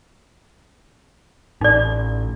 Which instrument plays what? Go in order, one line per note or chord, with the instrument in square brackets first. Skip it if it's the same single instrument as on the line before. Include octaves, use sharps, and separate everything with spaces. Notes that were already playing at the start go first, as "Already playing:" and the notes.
[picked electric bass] A1 [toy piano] D#4 D5